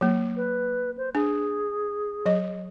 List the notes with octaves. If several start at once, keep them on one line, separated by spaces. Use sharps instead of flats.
F#3 A#3
B4
C5
D4 G#4
F#3 D#5